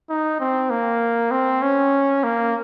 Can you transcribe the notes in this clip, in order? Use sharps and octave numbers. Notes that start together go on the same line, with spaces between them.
D#4
C4
A#3
C4
C#4
A#3